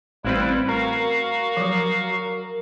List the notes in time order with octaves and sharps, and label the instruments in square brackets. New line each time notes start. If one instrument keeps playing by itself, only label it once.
[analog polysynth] A1 C4 B4 [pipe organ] G3 E4 [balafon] A3
[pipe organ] F#4 F5 [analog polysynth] A#4
[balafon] F3 F#3